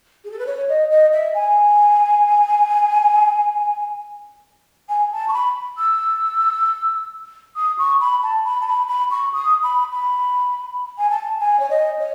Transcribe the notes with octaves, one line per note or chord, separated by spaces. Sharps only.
G#4
A4
B4
C#5
D#5
D#5
E5
G#5
G#5
A5
C#6
B5
E6
D#6
C#6
B5
A5
B5
A5
B5
B5
C#6
D#6
B5
B5
G#5
A5
G#5
C#5
D#5
C#5